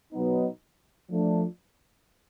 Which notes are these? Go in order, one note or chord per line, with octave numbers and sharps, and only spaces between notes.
B2 F#3 B3 D#4
F3 A3 D4